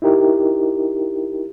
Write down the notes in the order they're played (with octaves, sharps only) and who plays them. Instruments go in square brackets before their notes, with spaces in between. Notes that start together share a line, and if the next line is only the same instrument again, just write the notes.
[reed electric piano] D#4 E4 G4 A#4